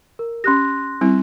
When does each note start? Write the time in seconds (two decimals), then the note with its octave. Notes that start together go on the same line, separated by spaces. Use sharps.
0.19 A#4
0.44 C#4 G4 C6 F#6 A#6
1.01 G3 C4 E4